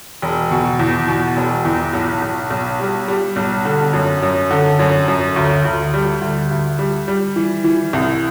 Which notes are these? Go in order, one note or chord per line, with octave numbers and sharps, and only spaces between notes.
E1
B2
E2
B2
E1
E2
B1
B1
B1
G3
G3
B1
D3
F#2
F#2
D3
F#2
F#2
D2
D2
G3
D2
D2
G3
G3
E3
E3
C2